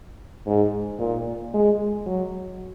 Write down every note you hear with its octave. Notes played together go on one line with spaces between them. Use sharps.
G#2
A#2
G#3
F#3